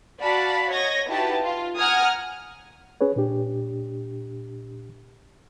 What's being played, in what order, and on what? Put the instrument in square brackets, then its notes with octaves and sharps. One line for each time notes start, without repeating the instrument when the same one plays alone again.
[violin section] F#4 D5 F5 F#5 A5 B5
C#5 D#5 G#6 A#6
D#4 E4 F#4 G4 B4 A5
F4
F#5 G#5 A#5 D#6 F6 G#6
[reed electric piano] C#4 G#4 B4 C#5
A#2 D4 G4